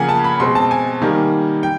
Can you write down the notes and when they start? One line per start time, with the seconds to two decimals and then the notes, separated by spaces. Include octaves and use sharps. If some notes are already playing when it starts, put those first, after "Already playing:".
Already playing: C#3 F3 A#3 F#5 G#5
0.09 A5
0.24 B5
0.40 B2 G#3 C4 C6
0.55 A5
0.71 G#5
1.02 D#3 G3 A#3
1.63 G5